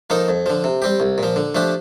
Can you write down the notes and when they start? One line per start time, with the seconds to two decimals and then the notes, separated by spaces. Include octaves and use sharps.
0.10 F3 A#3 D#4 A4
0.28 F2
0.46 D3 F3
0.64 C3
0.82 G3 C4 G4
1.00 C2
1.18 A#2 F3
1.36 D3
1.55 F3 A3 D4 G4